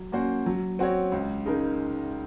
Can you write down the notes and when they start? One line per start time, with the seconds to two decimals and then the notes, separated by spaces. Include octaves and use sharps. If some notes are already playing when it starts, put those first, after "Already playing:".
Already playing: F#3
0.12 A#3 C#4 F#4 C5
0.46 F#3
0.79 C4 F#4 C#5
1.12 C#2
1.46 C#3 G#3 D#4 A#4